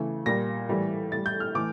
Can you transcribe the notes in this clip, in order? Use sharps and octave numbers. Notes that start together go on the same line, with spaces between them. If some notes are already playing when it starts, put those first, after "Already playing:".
Already playing: C#3 E3 A3
A#2 G3 A#6
A2 E3 G3
A2 G3 A6
G6
F6
A2 E3 A3 D6